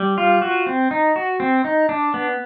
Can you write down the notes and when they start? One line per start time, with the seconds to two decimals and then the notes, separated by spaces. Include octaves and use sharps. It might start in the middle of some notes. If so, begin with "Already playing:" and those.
Already playing: G3
0.18 F4
0.42 F#4
0.67 C4
0.91 D#4
1.16 F#4
1.40 C4
1.65 D#4
1.89 D4
2.14 B3